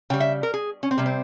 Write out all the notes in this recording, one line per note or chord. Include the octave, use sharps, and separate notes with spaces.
C#3 G3 G5
E5
A#4
G#4
C#4
C4
C3 G3 A#3
C4